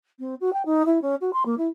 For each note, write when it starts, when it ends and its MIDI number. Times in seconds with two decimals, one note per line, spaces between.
0.19 0.35 60
0.41 0.53 66
0.53 0.65 79
0.65 0.83 63
0.86 1.01 64
1.02 1.15 61
1.21 1.31 66
1.33 1.43 84
1.46 1.55 58
1.58 1.68 64